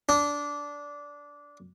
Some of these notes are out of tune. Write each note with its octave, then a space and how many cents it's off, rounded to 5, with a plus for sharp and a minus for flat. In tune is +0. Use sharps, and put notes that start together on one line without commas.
D4 -15